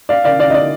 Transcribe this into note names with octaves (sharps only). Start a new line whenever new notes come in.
D5 F5
D5 F5
D5 F5
D#5
D5